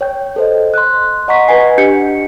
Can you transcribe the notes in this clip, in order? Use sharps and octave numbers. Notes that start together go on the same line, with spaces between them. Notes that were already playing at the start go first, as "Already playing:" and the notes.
C#5 G5 G6
A4 C5 D#5
C6 F#6
D#5 F#5 A#5 C#6 B6
B4 D#5 F#5 G#5 C7
D4 G4 G6 C#7